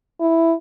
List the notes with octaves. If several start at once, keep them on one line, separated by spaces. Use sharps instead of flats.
E4